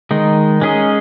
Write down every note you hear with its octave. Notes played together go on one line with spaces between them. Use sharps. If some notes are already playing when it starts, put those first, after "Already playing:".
D#3 G#3 D#4
G#3 C#4 G#4 D#5